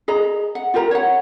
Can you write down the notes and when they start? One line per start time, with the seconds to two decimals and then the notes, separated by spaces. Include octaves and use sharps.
0.08 G#4 D#5 A#5
0.55 F#5
0.74 F4 G4 A#4 A#5
0.91 C#5 F#5